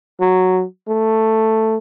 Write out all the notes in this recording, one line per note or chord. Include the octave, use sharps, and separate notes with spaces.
F#3
A3